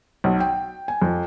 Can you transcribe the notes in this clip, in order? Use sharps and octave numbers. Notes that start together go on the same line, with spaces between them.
B1
G5
G#5
F2